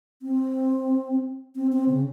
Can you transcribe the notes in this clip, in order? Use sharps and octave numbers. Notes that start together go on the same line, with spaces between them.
C4
C4
C4
C#3